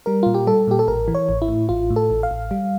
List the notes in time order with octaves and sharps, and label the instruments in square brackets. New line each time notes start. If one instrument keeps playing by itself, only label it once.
[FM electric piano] G3 A#4
A#2 F4
G4
G3 A4
A#2 G4
A4
A1 A#4
E3
C#5
A1
E4
A2
A1 F4
A2
A4
A1
F5
A1
G3